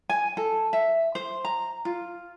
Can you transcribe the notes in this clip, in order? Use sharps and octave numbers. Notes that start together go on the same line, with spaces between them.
G#5
A4
E5
C5
A#5
F4